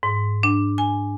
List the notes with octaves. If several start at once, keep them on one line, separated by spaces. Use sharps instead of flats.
G#2
D4
G#5